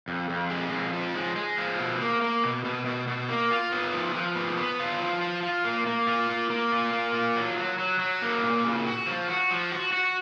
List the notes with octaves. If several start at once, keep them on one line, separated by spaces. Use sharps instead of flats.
F2
F2
G#3
F2
F3
G#3
G#3
F3
B2
A#3
A#3
B2
B2
B2
B2
A#3
F4
B3
F3
F3
B3
B3
F4
F3
F4
F4
A#3
A#3
F4
A#3
A#3
F4
A#3
F4
F#3
F#3
F#3
F#3
A#3
A#2
C#3
F#4
F3
F#4
F3
F#4
F#4